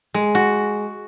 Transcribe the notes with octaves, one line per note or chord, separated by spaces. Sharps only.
G#3
F#4